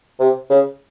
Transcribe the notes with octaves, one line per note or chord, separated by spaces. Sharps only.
C3
C#3